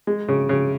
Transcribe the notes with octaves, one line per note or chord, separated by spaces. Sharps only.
G#3
C#3
C#3